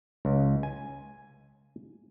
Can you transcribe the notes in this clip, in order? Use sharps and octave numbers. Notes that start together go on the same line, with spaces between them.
C#2
G#5